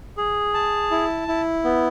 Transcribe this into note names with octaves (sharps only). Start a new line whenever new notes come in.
G#4
A5
E4
E4
B3